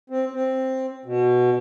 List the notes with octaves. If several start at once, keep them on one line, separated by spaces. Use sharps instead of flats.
C4
C4
B2